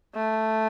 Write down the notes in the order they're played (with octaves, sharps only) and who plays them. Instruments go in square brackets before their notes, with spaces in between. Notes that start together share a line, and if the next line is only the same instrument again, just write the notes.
[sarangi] A3